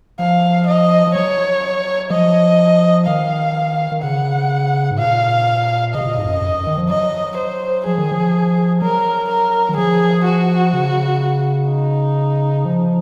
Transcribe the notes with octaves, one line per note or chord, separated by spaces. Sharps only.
F3 F5
D#5
F3
F#3 C#5
F3 D#5
D#3 F5
D#3
C#3 F#5
G#2
A#2 F5
C#3 D#5
C3
A#2
G#2
F2
F#2
F#2
F#2
D#3
F3
F#3 D#5
C5
F3 G#4
D#3
F3
F#3 A#4
A#4
D#3
F3 G#4
F#4
C#3
D#4
F3